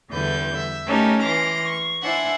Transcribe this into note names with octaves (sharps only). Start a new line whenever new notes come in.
E2 D3 G3 E4 B4 G6
E5
A3 C#4 D#4 G4 A4 A#4
E3 C6 D6 F6 A#6
C#6
D4 E4 C5 E5 F#5 G#5